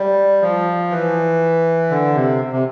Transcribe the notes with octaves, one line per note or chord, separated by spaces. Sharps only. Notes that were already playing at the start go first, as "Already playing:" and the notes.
Already playing: G3
F3
E3
D3
C3
C3